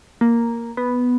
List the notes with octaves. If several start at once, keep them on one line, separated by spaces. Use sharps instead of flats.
A#3
B3